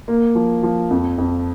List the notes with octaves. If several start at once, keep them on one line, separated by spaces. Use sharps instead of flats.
A#3
F3
F3
F2
F2